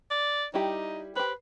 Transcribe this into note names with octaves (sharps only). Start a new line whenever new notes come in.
D5
G3 D#4 E4 G4
G4 B4 C5